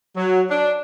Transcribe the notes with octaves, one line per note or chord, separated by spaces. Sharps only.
F#3
D4